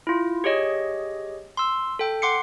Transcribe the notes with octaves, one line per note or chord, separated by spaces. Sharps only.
E4 F4
G4 G#4 C#5 D#5
C6 E6
A4 G5
F#5 C6 D6 C7 C#7